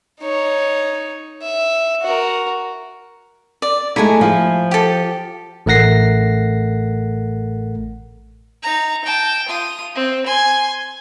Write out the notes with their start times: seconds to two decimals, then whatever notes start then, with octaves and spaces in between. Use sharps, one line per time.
0.21 D#4 C#5
1.42 E5
2.02 F#4 A#4
3.62 D5
3.96 G#3 A3 D#4 E4 G#5
4.21 F3
4.71 G4 A4
5.66 A1 A3 A#4 F#5 A#6 C7
8.62 D#4 A#5
9.05 G5 A5
9.49 F4 D#6
9.95 C4
10.26 G#5 C6